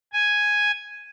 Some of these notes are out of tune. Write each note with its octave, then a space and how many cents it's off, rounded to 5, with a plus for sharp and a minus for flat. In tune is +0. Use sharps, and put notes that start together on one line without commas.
G#5 +0